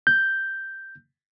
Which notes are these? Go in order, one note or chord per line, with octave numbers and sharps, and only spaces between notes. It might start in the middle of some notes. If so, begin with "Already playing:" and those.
G6